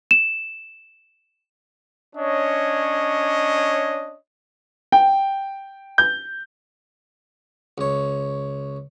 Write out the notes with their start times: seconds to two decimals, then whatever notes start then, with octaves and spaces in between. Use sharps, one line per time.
0.11 E7
2.16 C#4 D4 C#5 D#5
4.92 G5
5.98 G6
7.78 C#2 C#5